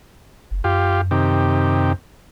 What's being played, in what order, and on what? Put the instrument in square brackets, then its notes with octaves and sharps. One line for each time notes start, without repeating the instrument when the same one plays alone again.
[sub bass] F#1
[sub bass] F#2 [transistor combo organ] F4 G4
[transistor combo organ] C3 D#3 G4